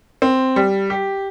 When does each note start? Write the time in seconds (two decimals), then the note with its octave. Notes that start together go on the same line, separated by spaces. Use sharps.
0.22 C4
0.56 G3
0.90 G4